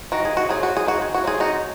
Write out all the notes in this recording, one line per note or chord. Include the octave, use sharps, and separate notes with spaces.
D#3 F#4
G#4
F#4
F#3 C4 G#4
F#4
G#4
D#3 F#4
G#4
F#4
F#3 C4 G#4
D#4 F#4